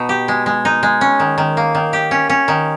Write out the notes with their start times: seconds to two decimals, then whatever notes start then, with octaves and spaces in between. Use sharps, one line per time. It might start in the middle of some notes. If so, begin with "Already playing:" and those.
Already playing: B2 D#4
0.09 G4
0.28 G#3
0.46 G#3
0.65 D#4
0.83 G#3
1.01 C#4
1.20 D#3
1.38 D#3
1.57 A#3
1.75 D#3
1.93 G4
2.11 C#4
2.30 C#4
2.48 D#3